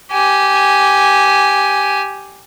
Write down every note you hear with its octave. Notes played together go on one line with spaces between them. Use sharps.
G4 G#5